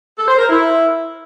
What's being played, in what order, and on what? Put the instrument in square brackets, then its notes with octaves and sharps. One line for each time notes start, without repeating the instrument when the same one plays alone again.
[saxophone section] A4
C5
A#4
E4